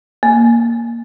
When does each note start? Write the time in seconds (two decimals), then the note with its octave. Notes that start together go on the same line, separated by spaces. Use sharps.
0.23 A#3